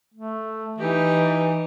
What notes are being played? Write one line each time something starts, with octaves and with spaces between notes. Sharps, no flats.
A3
E3 D#4 G4